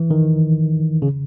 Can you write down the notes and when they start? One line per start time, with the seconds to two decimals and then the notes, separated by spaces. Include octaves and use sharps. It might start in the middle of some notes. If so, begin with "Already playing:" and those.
Already playing: E3
0.11 D#3
1.02 C#3